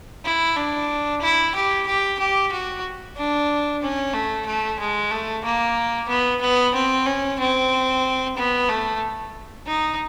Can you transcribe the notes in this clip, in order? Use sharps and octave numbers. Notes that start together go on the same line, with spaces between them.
E4
D4
E4
G4
G4
G4
F#4
D4
C#4
A3
A3
G#3
A3
A#3
B3
B3
C4
C#4
C4
B3
A3
D#4